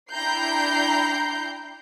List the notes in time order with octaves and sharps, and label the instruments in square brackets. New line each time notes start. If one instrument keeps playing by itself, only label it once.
[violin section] D4 E4 G5 A#5 G6 C7